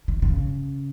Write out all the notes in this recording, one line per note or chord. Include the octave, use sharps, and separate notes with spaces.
D#3
D#3
C#3